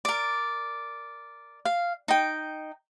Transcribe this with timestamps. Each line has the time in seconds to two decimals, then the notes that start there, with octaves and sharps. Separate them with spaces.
0.05 A#4 D5
1.65 F5
2.08 D#4 G5